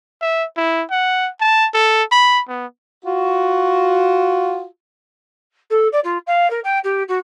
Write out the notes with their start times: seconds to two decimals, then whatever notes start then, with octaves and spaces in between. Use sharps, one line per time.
0.21 E5
0.57 E4
0.91 F#5
1.40 A5
1.74 A4
2.12 B5
2.48 B3
3.05 F4 F#4
5.70 A4
5.92 D5
6.04 F4
6.26 F5
6.50 A#4
6.64 G5
6.83 G4
7.08 F#4